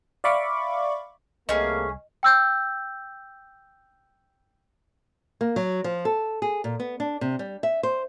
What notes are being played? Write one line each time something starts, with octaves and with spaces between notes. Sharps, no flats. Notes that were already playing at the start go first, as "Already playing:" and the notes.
D5 E5 F5 B5 C#6 D6
C2 C3 A3 A#3 C#4 G#4 D#5
G5 E6 G6
A#3
F#3
F3
A4
G#4
A#2
B3
D4
C3
G3
E5
C5